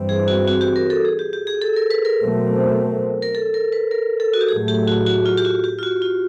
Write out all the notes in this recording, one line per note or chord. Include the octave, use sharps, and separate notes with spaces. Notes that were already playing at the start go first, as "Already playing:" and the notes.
Already playing: G2 E3 G3 C4
G#4
F#4
F#4
G4
A#4
A4
G#4
G4
G4
G#4
A4
A#4
B4
A#4
B2 F#3 A3 C4
A#4
A4
A#4
B4
A#4
A4
F#4
G4
A2 F#3 A3 G#4
G4
F#4
F#4
F4
G4
F#4
G4
F4
F#4
F4